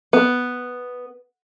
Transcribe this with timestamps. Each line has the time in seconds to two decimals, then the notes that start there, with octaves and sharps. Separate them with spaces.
0.13 B3